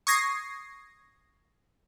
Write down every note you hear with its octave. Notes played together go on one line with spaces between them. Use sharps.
C#6 D#6 G#6 A#6 C7